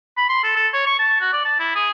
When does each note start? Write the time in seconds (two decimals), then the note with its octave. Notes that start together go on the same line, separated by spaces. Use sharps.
0.17 B5
0.29 C6
0.44 A4
0.56 A4
0.74 C#5
0.86 C#6
0.99 A5
1.21 F#4
1.33 D5
1.45 A5
1.59 E4
1.75 G#4